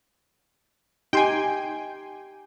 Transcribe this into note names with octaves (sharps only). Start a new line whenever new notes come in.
D#4 G4 G5 G#5 C6